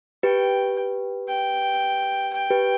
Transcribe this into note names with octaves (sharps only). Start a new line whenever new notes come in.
G4 B4 G5
G5
G5
G4 B4